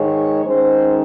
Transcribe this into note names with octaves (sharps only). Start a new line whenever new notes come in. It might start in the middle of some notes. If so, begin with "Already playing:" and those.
Already playing: G#2 D#3 G#3 C#5
D#3 G#3 C#4 C5